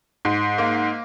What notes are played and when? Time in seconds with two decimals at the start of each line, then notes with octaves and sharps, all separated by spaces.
0.25 G#2
0.58 A#3